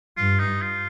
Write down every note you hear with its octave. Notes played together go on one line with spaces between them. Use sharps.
G2 F4
D#4
F4